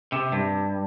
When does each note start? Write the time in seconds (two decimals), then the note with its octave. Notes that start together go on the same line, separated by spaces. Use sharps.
0.12 C3
0.32 G2